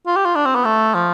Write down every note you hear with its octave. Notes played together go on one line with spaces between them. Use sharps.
F4
G4
F4
D4
C4
B3
A3
F3